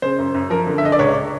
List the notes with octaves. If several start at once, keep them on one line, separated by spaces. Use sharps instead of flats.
C#3 C5
F#2
F#2
F3 A#4
D3
E5
D3 D#5
D5
C#2 C#5